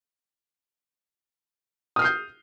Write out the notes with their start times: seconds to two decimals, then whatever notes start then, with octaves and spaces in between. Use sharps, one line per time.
1.96 D#6
1.99 F6
2.02 C7
2.04 G6